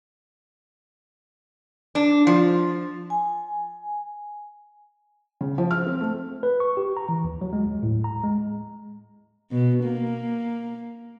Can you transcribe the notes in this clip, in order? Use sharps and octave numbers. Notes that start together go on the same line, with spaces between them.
D4
F3
G#5
C#3
F3
F6
C4
A3
B4
C#6
G4
A#5
E3
D#2
F#3
G#3
D#2
A2
A#5
G#3
B2
A#3